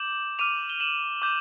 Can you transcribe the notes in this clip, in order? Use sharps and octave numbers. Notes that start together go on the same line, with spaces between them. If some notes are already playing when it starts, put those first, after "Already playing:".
Already playing: D6 G6 E7 F#7
D6 F6 D#7 F7
G7
E7 F#7
D6 G6